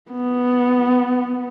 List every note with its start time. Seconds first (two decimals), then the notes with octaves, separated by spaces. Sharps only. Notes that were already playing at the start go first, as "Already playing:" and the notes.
0.11 B3